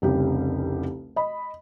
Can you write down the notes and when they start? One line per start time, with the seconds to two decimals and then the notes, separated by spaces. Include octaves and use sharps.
0.02 F1 C2 C#3 G4
1.16 D#5 B5